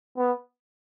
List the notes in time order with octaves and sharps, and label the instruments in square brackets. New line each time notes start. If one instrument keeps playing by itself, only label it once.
[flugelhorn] B3